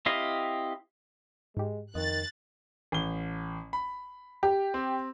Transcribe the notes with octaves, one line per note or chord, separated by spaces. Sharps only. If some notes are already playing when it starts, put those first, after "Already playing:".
C4 E4 G4 D#5 F5
G#2 G#3 G4
F2 D#3 D#5 F#6 A6
A1 G7
B5
G4
C4